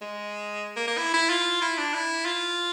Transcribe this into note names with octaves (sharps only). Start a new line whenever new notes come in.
G#3
A#3
A#3
E4
E4
F4
E4
D4
E4
F4